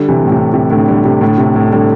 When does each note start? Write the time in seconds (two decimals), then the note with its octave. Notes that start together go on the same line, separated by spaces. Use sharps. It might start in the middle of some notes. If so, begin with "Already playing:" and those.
Already playing: D3 G3
0.08 C3 E3
0.25 A2
0.32 C3
0.54 C3
0.70 A2 D3
0.88 D3 G3
1.05 C3
1.21 A2 D3
1.38 C3
1.55 A2 D3
1.72 D3 G3